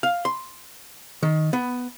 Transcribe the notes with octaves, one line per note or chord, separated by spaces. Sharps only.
F5
C6
D#3
B3